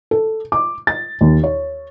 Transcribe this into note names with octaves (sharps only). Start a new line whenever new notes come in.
A4
D6
A6
D#2
C#5